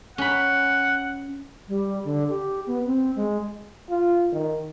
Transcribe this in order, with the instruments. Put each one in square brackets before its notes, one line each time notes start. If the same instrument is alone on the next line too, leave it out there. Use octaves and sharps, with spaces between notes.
[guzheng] C#4 B5 [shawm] F#5
[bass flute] G3
D3
G4
B3
C4
G#3
[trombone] F4
D#3